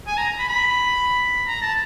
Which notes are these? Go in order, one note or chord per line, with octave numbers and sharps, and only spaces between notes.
G#5
A#5
B5
B5
A#5
A5